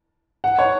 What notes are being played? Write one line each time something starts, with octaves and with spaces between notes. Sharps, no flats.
F#5
C#5